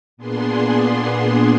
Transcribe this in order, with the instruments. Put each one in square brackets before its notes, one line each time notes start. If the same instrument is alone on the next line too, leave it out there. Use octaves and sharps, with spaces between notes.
[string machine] A#2 B3 D4 G#4 C6